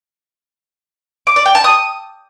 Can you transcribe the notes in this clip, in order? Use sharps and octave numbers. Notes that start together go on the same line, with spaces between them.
D6
D5
G5
A5
D#6